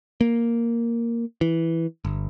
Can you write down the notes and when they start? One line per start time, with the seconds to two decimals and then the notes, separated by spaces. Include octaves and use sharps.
0.21 A#3
1.41 E3
2.05 G1